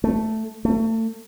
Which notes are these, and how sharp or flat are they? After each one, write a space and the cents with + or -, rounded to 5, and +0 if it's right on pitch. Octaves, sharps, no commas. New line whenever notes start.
A3 +0
A3 +30